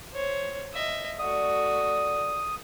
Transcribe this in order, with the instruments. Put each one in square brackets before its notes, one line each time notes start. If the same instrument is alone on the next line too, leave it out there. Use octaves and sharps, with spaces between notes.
[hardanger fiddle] C5 C#5
D#5 E5
[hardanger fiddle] A3 F#4 [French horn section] D5 [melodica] D#6